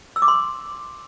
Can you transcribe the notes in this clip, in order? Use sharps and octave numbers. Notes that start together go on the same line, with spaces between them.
E6
D6
C6